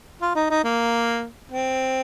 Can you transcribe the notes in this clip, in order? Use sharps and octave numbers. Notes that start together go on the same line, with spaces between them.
F4
D#4
D#4
A#3
C4